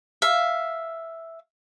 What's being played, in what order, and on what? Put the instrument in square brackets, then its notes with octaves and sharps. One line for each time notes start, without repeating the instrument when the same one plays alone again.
[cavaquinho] E5 F5